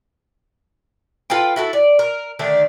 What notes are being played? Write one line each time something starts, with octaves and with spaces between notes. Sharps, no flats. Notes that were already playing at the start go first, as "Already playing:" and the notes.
F4 A4 B4 G5
E4 F#4 A4
D5
A#4
D3 D#3 A3 D4